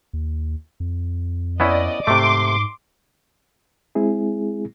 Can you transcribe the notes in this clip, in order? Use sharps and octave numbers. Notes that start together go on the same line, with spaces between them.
D#2
F2
B3 C#4 E4 D5 D#5
G#2 C3 A3 C6 D6
G#3 C4 E4 G#4